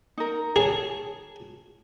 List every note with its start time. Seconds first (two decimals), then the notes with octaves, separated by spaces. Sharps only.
0.18 D#4 A#4
0.56 G#4 C#5 A5